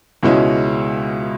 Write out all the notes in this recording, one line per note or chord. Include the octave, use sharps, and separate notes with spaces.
C#2 B2 G#3 C#4 E4